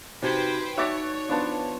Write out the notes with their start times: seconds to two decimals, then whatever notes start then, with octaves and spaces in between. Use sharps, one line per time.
0.23 C3 D#4 F#4 B4 C5 G5 G#6
0.78 D#4 F#4 C#5 D5 E5 D6
1.29 F3 B3 D4 A5